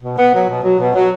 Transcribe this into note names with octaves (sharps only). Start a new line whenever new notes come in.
B2
B3
F#3
B2
F#3
B2
F#3